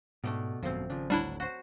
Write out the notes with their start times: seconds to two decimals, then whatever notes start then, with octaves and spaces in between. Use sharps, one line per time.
0.24 G#2 B2 G3 A3 D4
0.63 G#1 F#2 B2 F3 C4
0.90 C#3 F3 D4
1.10 D1 D2 F#3 G3 D4 E4
1.40 F#4 C5